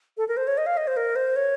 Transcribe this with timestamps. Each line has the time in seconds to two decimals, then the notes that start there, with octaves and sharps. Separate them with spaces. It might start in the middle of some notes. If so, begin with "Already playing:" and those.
0.18 A4
0.28 A#4
0.37 C5
0.47 C#5
0.57 D#5
0.66 F5
0.77 D#5
0.87 C5
0.97 A#4
1.16 C5
1.36 C#5